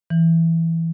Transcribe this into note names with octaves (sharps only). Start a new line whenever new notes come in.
E3